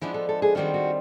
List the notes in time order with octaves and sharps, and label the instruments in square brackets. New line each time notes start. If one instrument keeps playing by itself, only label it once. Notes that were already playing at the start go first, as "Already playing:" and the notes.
[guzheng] F3 G#3 B3 D4 [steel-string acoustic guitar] E4
[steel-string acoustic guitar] A4
A4
G#4
[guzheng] D#3 G3 C4 F4 [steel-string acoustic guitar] F#4
[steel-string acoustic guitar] F#4